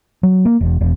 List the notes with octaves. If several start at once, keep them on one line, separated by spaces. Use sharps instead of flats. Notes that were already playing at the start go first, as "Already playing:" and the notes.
F#3
A#3
E1
E1